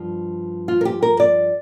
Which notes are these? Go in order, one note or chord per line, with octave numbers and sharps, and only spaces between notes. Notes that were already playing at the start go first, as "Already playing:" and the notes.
Already playing: G2 F3
F4
A#4
G4
A#4
D5